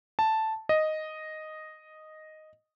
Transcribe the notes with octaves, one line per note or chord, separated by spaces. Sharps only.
A5
D#5